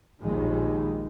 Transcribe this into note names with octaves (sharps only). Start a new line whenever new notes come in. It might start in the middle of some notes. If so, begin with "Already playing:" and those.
A#1 D#2 D#3 G#3